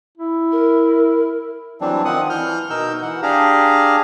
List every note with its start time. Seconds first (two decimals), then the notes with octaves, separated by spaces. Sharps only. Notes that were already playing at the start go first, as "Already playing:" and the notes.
0.18 E4
0.52 A#4
1.81 E3 F#3 G3 C4 D4
2.05 D#3 F3 C4 F#5 D#6
2.30 E3 F6 G6
2.70 B2 D#4 A#4 E6 G6
3.03 E3 F#5
3.23 D4 G4 G#4 F5 A#5